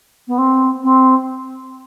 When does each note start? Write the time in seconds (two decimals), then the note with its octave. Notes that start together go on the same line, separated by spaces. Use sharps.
0.28 B3
0.38 C4
0.83 C4